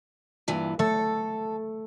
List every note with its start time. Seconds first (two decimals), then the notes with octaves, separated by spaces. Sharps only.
0.48 G2 A#2 E3
0.79 A3 A4